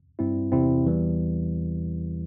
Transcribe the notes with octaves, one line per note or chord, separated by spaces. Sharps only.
G2 G3 C4 E4
E2 C3 E3 C4 E4
E2 E3 G3